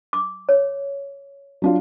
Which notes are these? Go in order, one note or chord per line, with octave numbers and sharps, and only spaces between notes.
D6
C#5
F#3 D4 F4